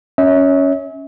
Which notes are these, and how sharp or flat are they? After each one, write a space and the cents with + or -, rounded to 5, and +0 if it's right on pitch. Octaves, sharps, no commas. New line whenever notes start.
C#4 +0 C#5 +15 E5 -40